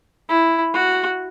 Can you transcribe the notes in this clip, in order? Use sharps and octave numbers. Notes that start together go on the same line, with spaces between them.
E4
F#4